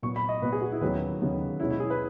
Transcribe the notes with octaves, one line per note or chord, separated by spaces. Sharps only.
A#2 F#3 B3 C#6
B5
D#5
A#2 F#3 B3 B4
G#4
F#4
E4
D#2 C#3 F#3 B3 B4
D#2 C#3 F#3 B3
B2 G#3 C#4 E4
E4
G#4
B4